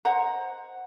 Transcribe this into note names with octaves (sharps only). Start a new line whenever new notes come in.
C5 D#5 F#5 A#5